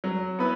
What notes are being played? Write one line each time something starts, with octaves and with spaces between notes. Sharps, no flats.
F#3
B3 E4 B4